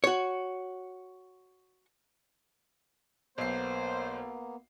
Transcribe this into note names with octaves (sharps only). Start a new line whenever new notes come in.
F#4 C#5
B1 A#3 B3 C5 C7